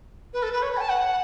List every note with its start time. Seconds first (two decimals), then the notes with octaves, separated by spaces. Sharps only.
0.33 B4
0.43 A4
0.53 B4
0.62 C#5
0.72 B5
0.77 F#5
0.80 A5
0.90 F#5